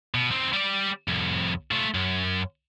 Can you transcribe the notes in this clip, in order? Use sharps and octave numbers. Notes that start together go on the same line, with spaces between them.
B2
C4 D#4
G3 D5
C2 F2
A3 F4
F#2